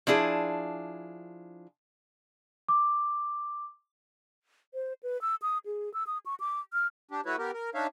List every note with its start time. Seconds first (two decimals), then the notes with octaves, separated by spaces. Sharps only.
0.07 F3 D4 E4 G#4
2.69 D6
4.74 C5
5.03 B4
5.22 E6
5.42 D#6
5.66 G#4
5.94 E6
6.07 D#6
6.26 C#6
6.40 D6
6.73 F6
7.11 D4 G4
7.26 A3 E4 F#4 B4 C#5
7.38 B3 G4 A#4
7.54 A#4
7.75 D4 D#4 C#5 E5 F5